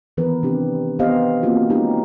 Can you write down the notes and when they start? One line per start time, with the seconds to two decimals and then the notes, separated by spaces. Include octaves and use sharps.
0.17 D#3 E3 B3 A#4 B4
0.43 C3 C4 D4 G4
0.99 B3 G4 A#4 C5 D#5 F5
1.43 A#3 C4 F4 F#4
1.70 G#3 C#4 D#4 G4